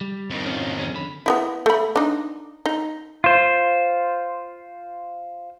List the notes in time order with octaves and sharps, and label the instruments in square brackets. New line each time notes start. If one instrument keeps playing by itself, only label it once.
[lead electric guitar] G3
[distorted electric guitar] F2 D#3
[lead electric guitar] C#4 F4
C#4 G#4
D3 B5
[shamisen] B3 D#4 E4
A3 B5
D4 D#4
D#4
[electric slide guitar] F4 C5